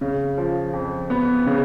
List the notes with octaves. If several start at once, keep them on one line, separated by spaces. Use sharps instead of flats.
C#3
F3
F2
B3
C#3